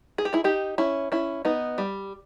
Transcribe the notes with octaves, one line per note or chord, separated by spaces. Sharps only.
G#4
G4
E4 G#4
D#4 G4
C#4 E4
C#4 E4
B3 D#4
G3